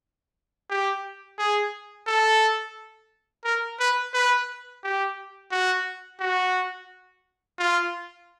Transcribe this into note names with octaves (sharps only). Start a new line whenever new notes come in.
G4
G#4
A4
A#4
B4
B4
G4
F#4
F#4
F4